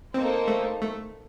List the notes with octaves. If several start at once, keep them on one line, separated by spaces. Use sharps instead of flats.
A#3 C4 D#4 A4 C5
A3
A3